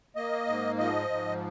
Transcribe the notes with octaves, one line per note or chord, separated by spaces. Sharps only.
A#3 D#5
G#2
F3 D#5
G#2